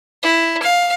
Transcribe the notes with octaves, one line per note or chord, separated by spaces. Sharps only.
E4
F5